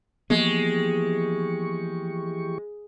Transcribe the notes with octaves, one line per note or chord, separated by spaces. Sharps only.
E3 F3 G#3 A#3 B3 G4 C#6